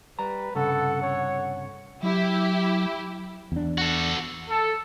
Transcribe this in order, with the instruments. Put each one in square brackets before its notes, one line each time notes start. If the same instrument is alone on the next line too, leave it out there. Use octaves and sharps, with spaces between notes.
[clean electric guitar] G3 A#5 [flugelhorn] B4
[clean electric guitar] C2 G2 C#3 [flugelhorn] A4 [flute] F#5
[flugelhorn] C#5
[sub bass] F#3 [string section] E4 G4
[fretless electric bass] E2 D4
[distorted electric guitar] F#4 A4
[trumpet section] A4